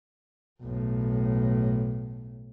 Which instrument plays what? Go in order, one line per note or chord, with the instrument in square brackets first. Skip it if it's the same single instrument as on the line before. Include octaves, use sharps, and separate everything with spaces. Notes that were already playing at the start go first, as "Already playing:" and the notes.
[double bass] B1 A2